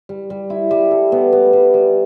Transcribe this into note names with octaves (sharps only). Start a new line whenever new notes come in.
G3
G3
E4
G3
A4
B3
B3
G3
G3